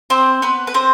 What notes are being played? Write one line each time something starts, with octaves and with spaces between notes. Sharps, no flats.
C4 C5
B3 B4
B4
C4 C5